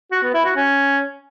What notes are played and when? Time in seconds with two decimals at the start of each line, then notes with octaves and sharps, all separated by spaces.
0.12 F#4
0.23 B3
0.34 E4
0.45 F#4
0.56 C#4